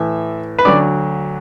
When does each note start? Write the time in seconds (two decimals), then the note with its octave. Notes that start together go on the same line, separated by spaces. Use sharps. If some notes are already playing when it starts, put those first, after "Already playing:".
Already playing: A2 E3 E5
0.59 B4
0.65 D2 D3 F#3 D5